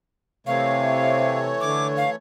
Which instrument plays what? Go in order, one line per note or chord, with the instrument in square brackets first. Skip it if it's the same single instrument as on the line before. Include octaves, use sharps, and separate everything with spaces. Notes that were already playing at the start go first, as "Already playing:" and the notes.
[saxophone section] C3 [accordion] E3 A3 C#5 [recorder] F5
[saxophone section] D3 [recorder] D6
[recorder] F5